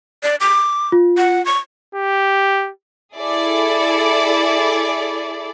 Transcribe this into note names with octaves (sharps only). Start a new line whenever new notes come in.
D5
D6
F4
F#5
C#6
G4
E4 G#4 A4 D5